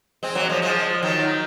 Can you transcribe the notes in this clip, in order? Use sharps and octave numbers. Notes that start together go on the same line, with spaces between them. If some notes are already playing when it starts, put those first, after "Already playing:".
G#3 C4
F#3 A#3
F3 G#3
F3 G#3
D#3 F#3